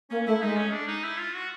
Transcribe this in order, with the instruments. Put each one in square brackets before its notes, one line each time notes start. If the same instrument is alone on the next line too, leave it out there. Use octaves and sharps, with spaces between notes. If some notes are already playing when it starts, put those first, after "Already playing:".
[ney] A#3 [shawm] C#4
[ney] A3 [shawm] E4
[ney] G#3 [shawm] D#4
[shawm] C#4
D4
D#4
E4
F4
F#4